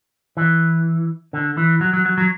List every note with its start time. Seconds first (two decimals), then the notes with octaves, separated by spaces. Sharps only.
0.37 E3
1.33 D3
1.57 E3
1.81 F#3
1.93 F#3
2.06 F#3
2.18 F#3